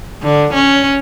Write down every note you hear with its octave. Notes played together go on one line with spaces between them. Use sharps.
D3
C#4